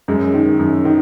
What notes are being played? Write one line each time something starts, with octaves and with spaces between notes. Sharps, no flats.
F#2 G#3
D#3
F#2
D#3